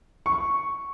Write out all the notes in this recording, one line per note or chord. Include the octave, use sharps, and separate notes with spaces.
C#6